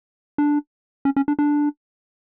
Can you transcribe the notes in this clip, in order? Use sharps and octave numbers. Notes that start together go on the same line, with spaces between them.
D4
C#4
C#4
D4
D4